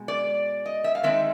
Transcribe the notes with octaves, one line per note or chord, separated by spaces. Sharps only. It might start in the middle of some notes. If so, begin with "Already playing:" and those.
Already playing: B2 G#3
D5
D#5
E5
F5
D#3 G#3 C4 D#4 E5